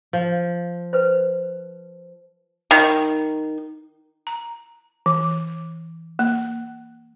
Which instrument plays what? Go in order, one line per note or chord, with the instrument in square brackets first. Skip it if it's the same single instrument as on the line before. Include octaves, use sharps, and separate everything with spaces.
[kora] F3
[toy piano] B4 C5
[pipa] D#3
[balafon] A#5
E3
A#3